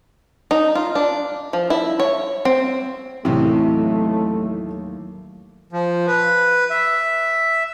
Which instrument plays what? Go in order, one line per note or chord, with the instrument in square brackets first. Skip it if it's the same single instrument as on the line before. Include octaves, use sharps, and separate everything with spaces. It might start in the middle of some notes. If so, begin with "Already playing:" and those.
[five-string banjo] D#4
F4
D4
F3
E4
C#5
C4
[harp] D#2 A2 F#3 [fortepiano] C3 [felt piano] E3 [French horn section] A3
[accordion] F3
B4
E5